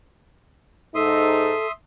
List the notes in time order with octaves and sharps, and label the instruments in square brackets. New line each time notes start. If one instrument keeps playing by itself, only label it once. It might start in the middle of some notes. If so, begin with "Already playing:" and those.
[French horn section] G#2 D#4 [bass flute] A4 [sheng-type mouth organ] E5 C6 D#6